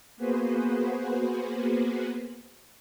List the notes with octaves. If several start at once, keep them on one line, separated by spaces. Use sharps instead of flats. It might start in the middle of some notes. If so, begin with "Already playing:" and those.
A#3 B3 F#4 G#4 B4 C5